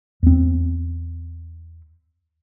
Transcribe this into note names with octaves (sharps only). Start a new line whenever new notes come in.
E2 C4